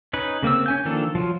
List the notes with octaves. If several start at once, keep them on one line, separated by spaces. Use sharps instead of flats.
C#4 D#4 B4
C#3 A#3 C4 E6
C#4 G#5 G6
D#3 F3 A#3 D4 A4
F3 F#3 F4